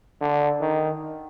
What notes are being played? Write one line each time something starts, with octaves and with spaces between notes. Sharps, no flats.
D3
D#3